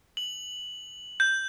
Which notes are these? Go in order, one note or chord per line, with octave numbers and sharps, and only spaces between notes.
F#7
G6